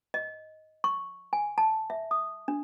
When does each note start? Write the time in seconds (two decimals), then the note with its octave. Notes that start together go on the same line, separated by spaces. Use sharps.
0.14 D#5
0.84 C#6
1.33 G#5
1.58 A5
1.90 E5
2.11 D#6
2.48 D4